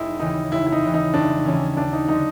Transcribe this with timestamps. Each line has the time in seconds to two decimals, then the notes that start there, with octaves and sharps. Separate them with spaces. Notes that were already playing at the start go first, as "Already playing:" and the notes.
Already playing: F1 D#4 E4
0.19 D#2 C#3 E3 D#4
0.51 F1 E4
0.67 E4
0.72 D#4
0.82 D#2 C#3 E3
0.94 D#4
1.14 F1 D4
1.45 D#2 C#3 E3 C#4
1.77 D#2 D4
1.93 D#4
2.08 D3 F#3 D#4